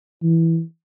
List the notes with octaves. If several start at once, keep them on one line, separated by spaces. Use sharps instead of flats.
E3